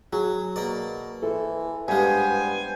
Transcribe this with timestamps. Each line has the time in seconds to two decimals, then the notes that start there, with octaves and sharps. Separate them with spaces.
0.13 F#3 G#4
0.56 B2 A#3 D5
1.22 E3 A4 C5
1.88 G2 G3 G#3 B3 G4 C5 F5 G#5